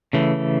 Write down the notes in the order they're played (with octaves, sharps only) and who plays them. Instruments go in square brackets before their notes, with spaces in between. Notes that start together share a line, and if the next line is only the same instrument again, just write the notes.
[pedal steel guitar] C#3 E3 A3